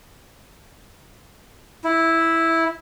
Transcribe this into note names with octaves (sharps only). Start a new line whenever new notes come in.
E4